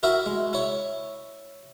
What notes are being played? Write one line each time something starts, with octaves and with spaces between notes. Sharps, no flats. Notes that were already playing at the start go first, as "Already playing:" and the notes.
E4 F#4 A#4 E5
G#3
E4 C#5